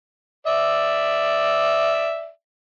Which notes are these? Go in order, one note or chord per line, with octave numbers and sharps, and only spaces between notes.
D5 E5